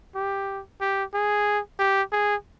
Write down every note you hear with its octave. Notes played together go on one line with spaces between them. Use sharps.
G4
G4
G#4
G4
G#4